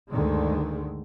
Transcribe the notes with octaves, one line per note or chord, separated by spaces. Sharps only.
D2 G2 D3 D#3 G#3